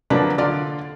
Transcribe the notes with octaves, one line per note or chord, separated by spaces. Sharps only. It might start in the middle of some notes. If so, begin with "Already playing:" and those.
D3 F3 F#3 A#3 D4 B4
D3 F4 D5